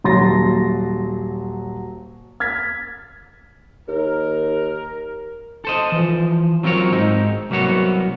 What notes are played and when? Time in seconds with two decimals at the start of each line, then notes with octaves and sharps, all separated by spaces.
0.04 D#1 F#3 C6 A6 A#6
2.40 F6 G#6 A6 B6
3.88 D#2 A#4
5.65 A4 C5 D#5
5.92 E3 F3
6.63 F#3 C4 F4 A#4 C#5
6.92 G#2 C4 D#4
7.50 C2 F#3 A#3 B3 F#4 C#5